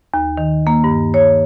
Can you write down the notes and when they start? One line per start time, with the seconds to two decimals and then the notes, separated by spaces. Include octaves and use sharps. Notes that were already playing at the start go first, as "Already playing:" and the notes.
0.14 D#2
0.38 D#3
0.67 A#3
0.84 G2
1.14 C#5